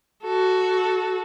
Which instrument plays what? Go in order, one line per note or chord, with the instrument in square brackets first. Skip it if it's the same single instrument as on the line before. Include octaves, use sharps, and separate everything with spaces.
[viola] F#4 A4